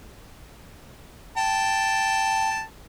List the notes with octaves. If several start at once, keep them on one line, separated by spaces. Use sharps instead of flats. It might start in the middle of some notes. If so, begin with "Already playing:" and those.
G5 A5